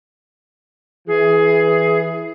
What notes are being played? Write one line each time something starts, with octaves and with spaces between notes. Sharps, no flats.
E3 G#4